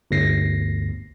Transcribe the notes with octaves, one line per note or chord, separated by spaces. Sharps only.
G1 D2 A#6 C7